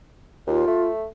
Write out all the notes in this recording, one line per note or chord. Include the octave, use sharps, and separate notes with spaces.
D#2 F4
A3